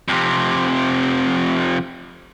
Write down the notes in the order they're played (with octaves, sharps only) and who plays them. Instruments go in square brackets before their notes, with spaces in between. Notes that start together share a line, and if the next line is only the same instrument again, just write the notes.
[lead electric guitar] F2 C3